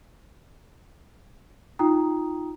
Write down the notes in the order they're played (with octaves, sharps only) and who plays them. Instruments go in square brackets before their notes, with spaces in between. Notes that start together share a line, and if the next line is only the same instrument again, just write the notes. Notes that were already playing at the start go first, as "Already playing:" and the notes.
[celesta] D#4 F4 G5 A#5 D#6